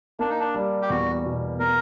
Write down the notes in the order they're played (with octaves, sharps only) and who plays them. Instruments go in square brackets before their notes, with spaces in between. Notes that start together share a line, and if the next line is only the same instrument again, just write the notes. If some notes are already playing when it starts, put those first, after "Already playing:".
[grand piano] A#3 [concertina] D4
[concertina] D#4
D4
[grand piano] G3
[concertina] G4
[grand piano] E2 [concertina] F#4
[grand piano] B2
[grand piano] A#3 [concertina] A#4